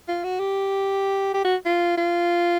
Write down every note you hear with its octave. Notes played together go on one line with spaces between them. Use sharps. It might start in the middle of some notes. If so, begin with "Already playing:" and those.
F4
F#4
G4
G4
F#4
F4
F4